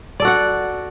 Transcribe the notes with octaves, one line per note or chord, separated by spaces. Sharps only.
F#4 A4 D5 F#5